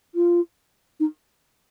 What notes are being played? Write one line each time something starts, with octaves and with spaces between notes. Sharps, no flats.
F4
D#4